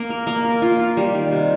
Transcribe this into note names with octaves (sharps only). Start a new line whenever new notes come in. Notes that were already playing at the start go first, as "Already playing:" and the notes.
Already playing: A#3
A#4
A#3
A#4
F4
F4
G3
D#3
C3